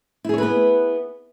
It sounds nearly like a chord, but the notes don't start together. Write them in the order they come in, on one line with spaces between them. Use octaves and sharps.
E4 G#4 C#5 B4 B3